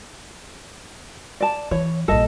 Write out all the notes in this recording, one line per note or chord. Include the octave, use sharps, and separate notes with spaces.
D5 A5
E3 C#5
A#1 G2 A4 D#5